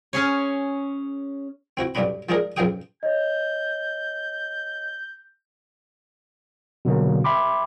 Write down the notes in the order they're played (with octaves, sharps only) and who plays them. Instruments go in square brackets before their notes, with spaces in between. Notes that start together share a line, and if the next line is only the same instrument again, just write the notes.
[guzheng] C#4 G#4 C#5
[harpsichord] C4 E4 F#4
B1 G2 C#4 D4 B5
F3 G#3 D4 D#4 G#4 A#4
B1 F#2 F3 G#4 G5 D#6
[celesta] C#5 D#5 [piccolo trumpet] G6
[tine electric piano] B2 D3 F#3 A#3
E5 G5 B5 C6 D6